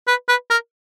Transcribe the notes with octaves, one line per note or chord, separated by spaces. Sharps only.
B4
B4
A#4